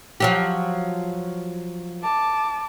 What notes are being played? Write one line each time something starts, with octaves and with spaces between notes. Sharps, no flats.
F3 F#3 G4
A5 D6